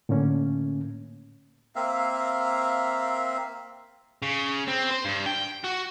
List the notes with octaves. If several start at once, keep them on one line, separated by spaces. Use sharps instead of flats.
A2 D3 A#3 C#4
A#3 C4 E5 F5
C#3
C4
C5
G2
G5
F#4